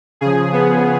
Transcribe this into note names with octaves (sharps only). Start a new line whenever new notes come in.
C#3 F3 G#4
B3